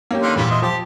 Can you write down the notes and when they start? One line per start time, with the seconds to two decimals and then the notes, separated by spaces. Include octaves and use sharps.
0.11 A#3 C#4 G4
0.22 D3 D#3 C6
0.36 E2 A#2 G3 B4
0.51 C5 D#5 E5
0.62 F3 G4 C5 A5